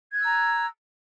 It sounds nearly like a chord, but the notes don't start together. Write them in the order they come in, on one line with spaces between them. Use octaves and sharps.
G#6 F#6 E6 A#5